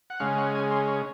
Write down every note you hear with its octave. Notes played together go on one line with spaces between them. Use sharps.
F#5
C#3 G#3 C#4 F5
F#5
G#5
C6
C#5